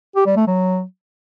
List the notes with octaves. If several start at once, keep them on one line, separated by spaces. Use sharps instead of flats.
G4
G3
A3
F#3